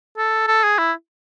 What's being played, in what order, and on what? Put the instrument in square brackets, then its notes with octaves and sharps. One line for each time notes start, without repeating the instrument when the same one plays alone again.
[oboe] A4
A4
G#4
E4